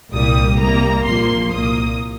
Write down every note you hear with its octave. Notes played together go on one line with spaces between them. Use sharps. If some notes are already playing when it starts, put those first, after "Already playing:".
C2 A#2 G3 A#3 D#6
C2 C3 G3 A#3 A#5
A#1 A#2 F3 A#3 C6
C2 A#2 A#3 D#6